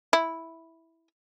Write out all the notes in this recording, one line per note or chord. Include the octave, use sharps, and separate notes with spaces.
E4